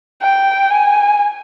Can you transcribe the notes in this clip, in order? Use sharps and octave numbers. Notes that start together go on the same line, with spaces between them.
G5
G#5